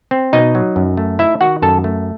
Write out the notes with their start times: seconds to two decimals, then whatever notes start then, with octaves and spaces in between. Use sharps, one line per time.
0.11 C4
0.33 B2 D#4 D#5
0.55 F#3
0.76 F#2
0.97 A3
1.19 D#4 E4 E5
1.41 D#3 F#4 F#5
1.62 F#2 A4 A5
1.84 A3